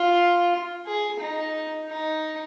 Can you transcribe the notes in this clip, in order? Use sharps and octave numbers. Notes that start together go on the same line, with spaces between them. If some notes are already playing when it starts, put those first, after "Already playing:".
Already playing: F4
G#4
D#4
D#4